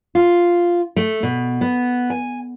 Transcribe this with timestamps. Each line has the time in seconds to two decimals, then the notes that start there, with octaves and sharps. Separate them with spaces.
0.15 F4
0.96 A3
1.23 B2
1.61 B3
2.10 G#5